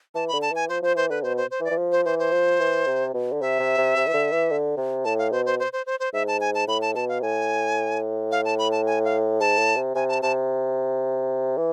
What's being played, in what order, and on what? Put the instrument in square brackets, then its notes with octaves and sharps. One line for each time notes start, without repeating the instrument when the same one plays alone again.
[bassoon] E3 [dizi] A5
[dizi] B5
[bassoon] D3
[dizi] A5
[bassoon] E3 [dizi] G#5
[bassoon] F3 [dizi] C5
[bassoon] F3 [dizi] C5
[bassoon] E3 [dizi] C5
[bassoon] D3 [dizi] B4
[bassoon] B2 [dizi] C5
[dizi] C5
C5
[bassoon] E3
[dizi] D5
[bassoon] E3
F3
[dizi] C5
[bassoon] E3 [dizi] C5
[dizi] C5
[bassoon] F3
E3
C3
B2
D3
[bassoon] C3 [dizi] E5
[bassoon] C3
C3
C3
E3
D3
E3
D3
C3
[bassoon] A2 [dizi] A5
[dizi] F5
[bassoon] B2 [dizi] C5
[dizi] C5
C5
C5
C5
C5
[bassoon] G#2 [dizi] E5
[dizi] A5
G#5
A5
[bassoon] A2 [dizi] B5
[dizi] A5
[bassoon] B2 [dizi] A5
[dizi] F5
[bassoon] A2 [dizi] G#5
[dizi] F5
A5
B5
A5
G#5
F5
[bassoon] G#2 [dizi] A5
[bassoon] A2
C3
[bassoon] C3 [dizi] G#5
[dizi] A5
[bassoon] C3 [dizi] A5
[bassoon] E3